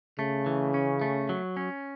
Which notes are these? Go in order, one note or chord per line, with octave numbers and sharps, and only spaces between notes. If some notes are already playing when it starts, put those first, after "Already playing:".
C#3 A3
E3
C#4
A3
F#3
C#4